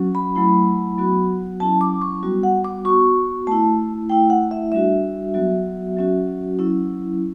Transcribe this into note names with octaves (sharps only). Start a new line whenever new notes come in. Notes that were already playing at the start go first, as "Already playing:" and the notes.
Already playing: F#3 C#4 F#4
B5
F#3 A3 E4
F#3 B3 F#4
F#3 C#4 E4 A5
D6
C#6
G3 B3 F#4
F#5
D6
B3 F#4 C#6
A3 E4 A5
A3 E4 G5
F#5
E5
G3 D4 F#4 E5
F#3 B3 F#4
F#3 C#4 F#4
F#3 C#4 E4